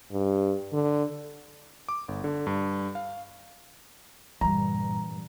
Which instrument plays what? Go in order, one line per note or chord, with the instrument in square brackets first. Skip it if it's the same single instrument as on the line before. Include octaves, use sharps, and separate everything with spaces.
[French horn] G2
D3
[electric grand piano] D6
G1
D3
G2
F5
[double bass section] G2 A#2 D3 [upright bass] E3 G3 [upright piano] A#5